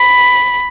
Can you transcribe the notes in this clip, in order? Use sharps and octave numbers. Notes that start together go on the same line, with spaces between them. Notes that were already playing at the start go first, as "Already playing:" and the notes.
Already playing: B5